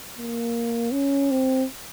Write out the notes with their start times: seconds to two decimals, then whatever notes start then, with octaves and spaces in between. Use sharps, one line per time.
0.18 A#3
0.93 C#4
1.31 C4